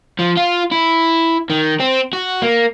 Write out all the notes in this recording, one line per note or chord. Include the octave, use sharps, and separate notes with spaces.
F3
F4
E4
D#3
C4
F#4
A#3